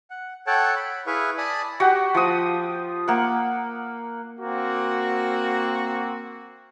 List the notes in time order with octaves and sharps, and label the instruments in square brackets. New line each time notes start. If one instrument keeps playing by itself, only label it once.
[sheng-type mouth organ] F#5
A4 C#5 F#5 G5 A5
B5
E4 G#4 B4 E5 F5 C#6
D5 G#5 A5 B5 D#6
[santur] F#4 G4 F#5 G5
F3 D#6
A#3 F#5
[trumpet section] A#3 C4 F#4